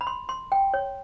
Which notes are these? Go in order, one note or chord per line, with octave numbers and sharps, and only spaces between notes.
B5
C6
C6
G5
C#5